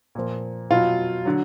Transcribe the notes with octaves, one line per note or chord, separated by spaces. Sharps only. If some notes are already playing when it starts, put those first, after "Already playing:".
A#2 F3
B2 F#3 F4
D3 F#3